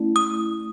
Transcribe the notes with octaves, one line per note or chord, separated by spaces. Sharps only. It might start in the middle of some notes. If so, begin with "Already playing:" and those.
Already playing: A3 C#4 E4
D#6